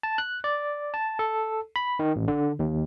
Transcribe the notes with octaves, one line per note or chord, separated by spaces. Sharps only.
A5
F#6
D5
A5
A4
B5
D#3
A1
D3
D#2